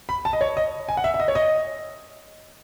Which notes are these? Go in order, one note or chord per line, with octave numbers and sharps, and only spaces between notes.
B5
A5
D#5
C#5
D#5
G#5
F#5
E5
E5
D#5
C#5
D#5